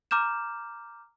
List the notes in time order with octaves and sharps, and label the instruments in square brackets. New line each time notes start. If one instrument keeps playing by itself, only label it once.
[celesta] A#5 D6 F6 G6 E7